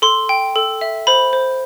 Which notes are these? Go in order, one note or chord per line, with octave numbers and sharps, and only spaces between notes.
A4 C6
G5
A4
E5
C5 B5
C5